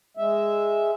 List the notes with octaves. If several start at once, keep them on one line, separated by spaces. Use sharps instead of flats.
G#3 E5